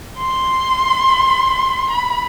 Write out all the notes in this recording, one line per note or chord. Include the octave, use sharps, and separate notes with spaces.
C6
B5